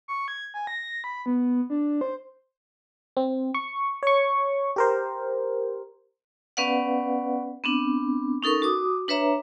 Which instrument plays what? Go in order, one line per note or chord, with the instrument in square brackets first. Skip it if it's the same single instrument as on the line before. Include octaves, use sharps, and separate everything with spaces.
[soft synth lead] C#6
G#6
G#5
A#6
B5
B3
D4
C5
[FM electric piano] C4
C#6
C#5 C#6
G4 A#4 C5
[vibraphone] B3 C#4 B4 D5 F5 F#5
B3 C4 D4
C#4 D#4 A4 A#4 C#6
F#4 D6 D#6
D4 B4 C#5 E5 A#5